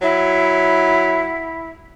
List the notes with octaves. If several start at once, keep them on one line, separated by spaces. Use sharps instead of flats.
F#3 E4